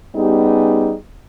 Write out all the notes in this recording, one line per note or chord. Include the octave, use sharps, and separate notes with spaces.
G3 B3 C#4 D#4 G4 G#4